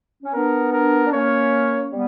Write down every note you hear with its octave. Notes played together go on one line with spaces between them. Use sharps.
C#4
B3 D4 A#4
A#4
D4
A#3 C#4 C#5
G3 B3